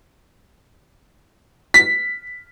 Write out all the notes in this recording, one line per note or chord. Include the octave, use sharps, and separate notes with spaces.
B6